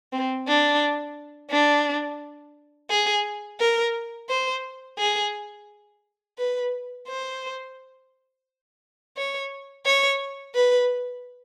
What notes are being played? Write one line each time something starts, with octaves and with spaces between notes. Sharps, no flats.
C4
D4
D4
G#4
A#4
C5
G#4
B4
C5
C#5
C#5
B4